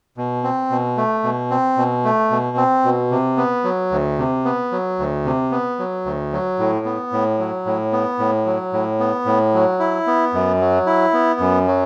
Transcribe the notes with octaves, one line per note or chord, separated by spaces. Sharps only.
B2
C4
B2
A3
B2
C4
B2
A3
B2
C4
B2
C3
B3
F#3
D2
C3
B3
F#3
D2
C3
B3
F#3
D2
F#3
A2
B3
A2
F#3
A2
B3
A2
F#3
A2
B3
A2
F#3
E4
B3
F#2
F#3
E4
B3
F#2
F#3